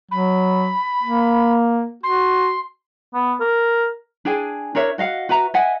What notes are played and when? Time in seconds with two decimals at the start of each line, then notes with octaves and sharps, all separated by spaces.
0.11 F#3 B5
1.03 A#3
2.03 F#4 C6
3.14 B3
3.40 A#4
4.25 D4 G#4 G5 G#5
4.75 D4 A#4 C#5 E5
4.98 F#4 D#5 F5 F#5
5.29 F#4 B4 E5 A#5
5.54 D#5 E5 F#5 G#5